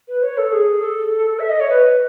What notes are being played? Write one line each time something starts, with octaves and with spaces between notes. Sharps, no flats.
B4
C#5
A4
G#4
A4
E5
D#5
C#5
B4